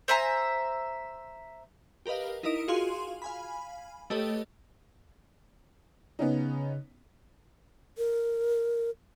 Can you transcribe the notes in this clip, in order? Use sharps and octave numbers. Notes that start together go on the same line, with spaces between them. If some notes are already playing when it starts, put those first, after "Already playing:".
C5 E5 G#5 A#5
G4 A#4 B4 D#5 F5
D#4 E4 A#4 D#5 D#6 D7
F4 F#4 G#4 F5 C6
F5 G#5 B5
A3 G4 A4 B4 C#5 D#5
C#3 B3 C#4 D#4
A#4